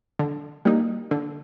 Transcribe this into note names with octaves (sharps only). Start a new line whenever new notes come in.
D3
G3 A#3 D#4
D3